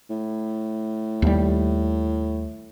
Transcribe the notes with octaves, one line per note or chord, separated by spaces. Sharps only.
A2
D#2 G3